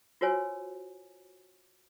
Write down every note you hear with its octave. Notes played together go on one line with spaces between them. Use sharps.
F4 F#4 A#4 C5 C#5 G#5